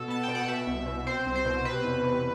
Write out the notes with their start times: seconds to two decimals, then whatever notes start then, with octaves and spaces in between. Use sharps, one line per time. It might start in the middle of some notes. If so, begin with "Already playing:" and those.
Already playing: B2 A4
0.08 B3 A5
0.23 B2 G5
0.35 F#5
0.48 B2 E5
0.67 C2
0.86 B2
1.07 C4 C5
1.26 C2
1.35 C5
1.45 B2
1.65 C3 B4
1.84 E2
2.03 C3